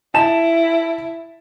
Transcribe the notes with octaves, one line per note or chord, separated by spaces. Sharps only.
E4 A5 E7